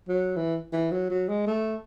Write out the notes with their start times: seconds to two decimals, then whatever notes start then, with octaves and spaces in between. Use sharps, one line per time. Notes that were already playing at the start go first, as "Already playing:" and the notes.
0.08 F#3
0.36 E3
0.73 E3
0.91 F#3
1.10 F#3
1.29 G#3
1.47 A3